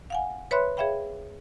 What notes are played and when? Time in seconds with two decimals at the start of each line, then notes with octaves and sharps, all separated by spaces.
0.10 F5 F#5 G#5
0.51 B4 C#5 E5 B5 C6 F#6
0.77 G#4 C#5 E5 F5 G5 B5